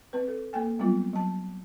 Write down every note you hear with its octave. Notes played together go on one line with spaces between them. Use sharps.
C4 B4
A4
A#3 A4 G5 G#5
F#3 G3 B3 C4 F4
F#3 A5